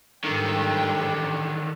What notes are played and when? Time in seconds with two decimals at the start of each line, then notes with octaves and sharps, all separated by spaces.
0.24 G#2 D3 D#3 G3 G5